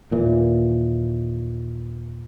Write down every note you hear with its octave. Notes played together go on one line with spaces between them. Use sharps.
D#2 A#2 E3